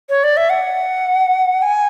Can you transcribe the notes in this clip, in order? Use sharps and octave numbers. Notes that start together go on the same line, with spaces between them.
C#5
D5
E5
F#5
G#5